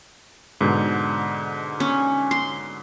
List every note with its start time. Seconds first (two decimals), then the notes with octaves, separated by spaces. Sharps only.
0.61 G#2 B2 D3
1.80 C#4
2.31 C6